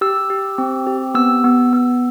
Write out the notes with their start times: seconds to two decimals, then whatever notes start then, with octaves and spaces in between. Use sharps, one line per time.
0.01 G4 E6
0.30 G4
0.58 C4
0.87 G4
1.15 B3 E6
1.44 B3
1.73 B3